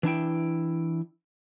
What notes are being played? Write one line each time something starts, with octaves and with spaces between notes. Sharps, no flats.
E3 D4 E4 G5